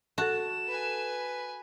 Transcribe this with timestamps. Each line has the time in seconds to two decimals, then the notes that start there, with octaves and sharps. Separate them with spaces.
0.18 F#4 A4 A5 E7
0.68 B4 G#5